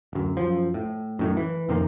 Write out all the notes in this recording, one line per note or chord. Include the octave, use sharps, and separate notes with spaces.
D1 F#2
F#2 F3
A2
F#2 A2 D#3
E3
F2 C3 D#3 A#3